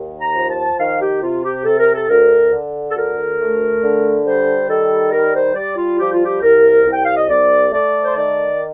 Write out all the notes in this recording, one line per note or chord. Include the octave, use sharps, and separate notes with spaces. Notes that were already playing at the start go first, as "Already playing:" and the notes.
Already playing: D#2
A#5
F3
A5
D#3 F5
G4
C3 F4
G4
C3 A4
A#4
A4
D2 A#4
D3
A4
D2 A#4
A3
D3
G3 C5
D#3 A4
G3 A#4
C5
G3 D5
F4
F3 G4
F4
G4
C2 A#4
C2
G5
F5
D#5
C2 D5
A3 D5
C5
D#3 D5